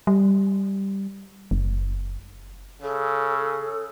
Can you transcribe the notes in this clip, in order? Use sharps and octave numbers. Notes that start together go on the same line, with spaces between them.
G3
F#1
C#3 A4